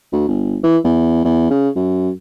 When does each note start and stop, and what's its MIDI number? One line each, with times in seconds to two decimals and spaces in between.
0.12 0.27 38
0.28 0.58 31
0.63 0.77 52
0.84 1.22 40
1.24 1.47 40
1.50 1.69 49
1.76 2.11 42